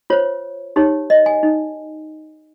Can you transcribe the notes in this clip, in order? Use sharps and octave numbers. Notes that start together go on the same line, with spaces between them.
F4 C5 C#5
D#4 G4 C#5
D#5
G#5
D#4